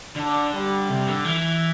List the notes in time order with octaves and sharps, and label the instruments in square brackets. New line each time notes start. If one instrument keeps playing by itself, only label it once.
[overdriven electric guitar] D3 [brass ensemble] D4
[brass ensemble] G3
[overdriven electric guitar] C3
D3
E3